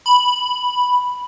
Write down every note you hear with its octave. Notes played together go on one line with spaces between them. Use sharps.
B5